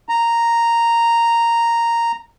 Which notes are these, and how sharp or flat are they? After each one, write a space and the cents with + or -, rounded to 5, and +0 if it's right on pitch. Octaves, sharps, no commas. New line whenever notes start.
A#5 -5